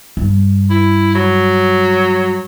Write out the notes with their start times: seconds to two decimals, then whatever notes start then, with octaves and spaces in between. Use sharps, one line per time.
0.17 G2
0.70 E4
1.15 F#3